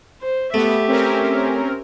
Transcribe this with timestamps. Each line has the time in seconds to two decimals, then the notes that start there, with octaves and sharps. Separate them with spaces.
0.21 C5
0.54 A3 B3 G4 E5
0.88 C4 C#4 A#4